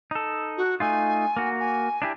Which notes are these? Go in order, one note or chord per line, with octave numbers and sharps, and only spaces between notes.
D#4 A4
F#4
A3 D#4 F4 G#5
A#3 F#4
G#5
D4 E4 G4